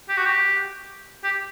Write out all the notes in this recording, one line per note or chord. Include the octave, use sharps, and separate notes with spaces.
G4
F#4
G4
G4